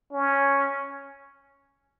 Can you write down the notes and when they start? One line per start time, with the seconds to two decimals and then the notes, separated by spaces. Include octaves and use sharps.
0.12 C#4